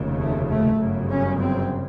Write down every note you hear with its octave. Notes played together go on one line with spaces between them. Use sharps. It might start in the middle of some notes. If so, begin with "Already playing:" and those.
Already playing: F1 D#2 C#3
A3
A3
G1 F#2 C#3
C#4
C4